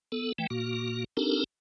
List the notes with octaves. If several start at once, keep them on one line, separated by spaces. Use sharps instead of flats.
B3 A4
E3 A3 G5
A#2 A#3 F#4
C4 D4 D#4 G4 A4 A#4